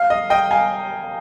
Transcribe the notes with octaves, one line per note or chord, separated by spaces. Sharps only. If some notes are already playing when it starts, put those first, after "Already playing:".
Already playing: F5
D#5
D#5 G5
F5 G#5